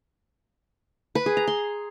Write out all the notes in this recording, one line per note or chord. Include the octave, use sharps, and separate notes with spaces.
B4
G#4
A#5
C6